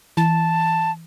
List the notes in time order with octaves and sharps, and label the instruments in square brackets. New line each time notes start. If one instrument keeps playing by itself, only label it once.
[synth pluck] E3 [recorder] A5